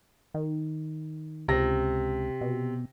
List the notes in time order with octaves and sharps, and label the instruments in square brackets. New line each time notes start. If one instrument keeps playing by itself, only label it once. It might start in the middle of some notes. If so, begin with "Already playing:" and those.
[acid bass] D#3
[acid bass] C#2 [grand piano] C3 A#6
[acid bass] B2